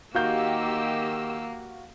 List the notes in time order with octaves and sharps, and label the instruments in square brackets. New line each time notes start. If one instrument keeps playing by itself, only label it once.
[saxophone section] D#3 [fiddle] A#3 [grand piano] F#4 F5 G6 [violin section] G4 E6